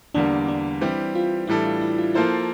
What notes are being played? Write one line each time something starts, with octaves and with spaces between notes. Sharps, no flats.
E2 D3 G3 A#3 D4
D4
E3 G3 C4 E4 G4
F4
A2 E3 G3 D4 E4 A4
F4
E4
F4
F3 A#3 E4 F4 A4 C5